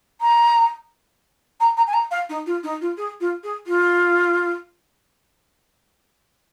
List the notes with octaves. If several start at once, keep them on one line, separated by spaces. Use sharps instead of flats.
A#5
A#5
A#5
G#5
A#5
F5
D#4
F4
D#4
F4
G#4
F4
G#4
F4